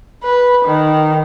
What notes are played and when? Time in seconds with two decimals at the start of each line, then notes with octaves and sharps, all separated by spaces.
0.23 B4
0.65 D#3